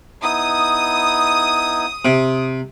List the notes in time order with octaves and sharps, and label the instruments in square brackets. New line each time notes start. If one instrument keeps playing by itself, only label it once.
[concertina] B3 D#4 E4 [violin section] D#6
[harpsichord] C3